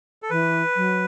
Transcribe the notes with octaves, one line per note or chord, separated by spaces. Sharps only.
A4
E3 B4
F#3